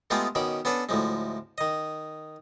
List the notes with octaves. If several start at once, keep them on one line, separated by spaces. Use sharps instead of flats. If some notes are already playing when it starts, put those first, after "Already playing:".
G#3 A3 B3 F4 G4 G#4
B2 D#3 C#4 B5 D6
B3 C#4 D4 A4 B4
D2 A2 F3 G#3
D#3 D#5